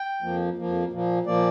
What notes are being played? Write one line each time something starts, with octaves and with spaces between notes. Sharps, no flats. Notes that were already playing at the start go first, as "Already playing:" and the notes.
Already playing: G5
F2 F3 A#3
F2 F3 A#3
A#2 F3 A#3
A#2 F3 A#3 D5